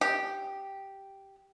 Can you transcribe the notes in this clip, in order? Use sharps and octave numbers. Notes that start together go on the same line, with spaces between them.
G4